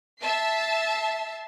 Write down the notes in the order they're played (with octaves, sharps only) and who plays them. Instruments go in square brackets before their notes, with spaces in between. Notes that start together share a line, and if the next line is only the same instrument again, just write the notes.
[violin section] E5 A5 C7